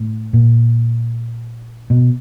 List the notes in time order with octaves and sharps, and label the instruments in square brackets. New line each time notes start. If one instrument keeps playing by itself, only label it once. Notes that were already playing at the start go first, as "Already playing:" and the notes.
Already playing: [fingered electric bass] A2
A#2
B2